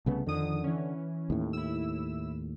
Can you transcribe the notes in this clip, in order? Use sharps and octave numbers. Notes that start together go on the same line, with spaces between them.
C2 C#3 A3 B3
F2 D3 D#3 D#6
E3 C#4
D#2 A2
E4 E6